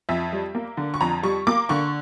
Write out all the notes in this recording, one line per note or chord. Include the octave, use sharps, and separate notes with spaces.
F2 E5
G3
A#3
D3
C#6
F2 A#5
G3 C#6
A#3 D6
D3 C#6